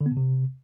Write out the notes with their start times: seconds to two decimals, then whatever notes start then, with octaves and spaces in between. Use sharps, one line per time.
0.01 D3
0.06 B3
0.11 B2
0.17 C3